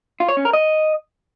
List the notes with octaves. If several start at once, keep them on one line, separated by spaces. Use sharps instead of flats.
F4
C#5
C#4
A#4
D#5